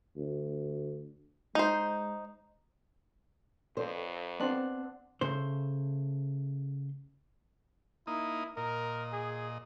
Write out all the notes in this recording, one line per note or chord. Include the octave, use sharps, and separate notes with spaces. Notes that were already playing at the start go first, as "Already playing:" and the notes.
D2
G#3 D#4 C5
F2 C5
B3 C4 D4 F#5 C6
C#3 A3 C5
A#3 D#4 E4 D#6
A#2 A#4 D#5
G#4